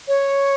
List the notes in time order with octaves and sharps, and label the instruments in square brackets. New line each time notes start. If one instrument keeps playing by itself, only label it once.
[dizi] C#5